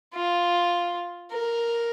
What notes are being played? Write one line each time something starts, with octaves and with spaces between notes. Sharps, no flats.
F4
A#4